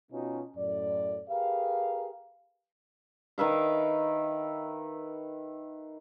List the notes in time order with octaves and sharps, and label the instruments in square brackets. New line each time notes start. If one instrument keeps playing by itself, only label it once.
[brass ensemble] B2 B3 C#4 D#4 F4 F#4
F#2 A2 D5
G4 G#4 A#4 B4 F5
[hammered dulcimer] D#3 B4 E5 F5